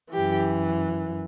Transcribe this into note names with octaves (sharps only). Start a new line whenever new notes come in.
F#2 E3 G4